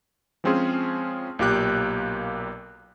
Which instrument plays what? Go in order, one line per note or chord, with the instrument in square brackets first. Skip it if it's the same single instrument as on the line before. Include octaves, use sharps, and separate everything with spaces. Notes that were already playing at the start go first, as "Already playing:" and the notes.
[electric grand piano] F3 G#3 C4 C#4 F4 G#4
B1 A#2 A#3 G4 D6 F#6